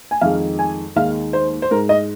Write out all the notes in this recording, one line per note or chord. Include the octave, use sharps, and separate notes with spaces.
G#5
F2 D#3 G#3 F5
G#5
D#2 D#3 G#3 F5
C5
C5
G#2 G#3 A#4
D#5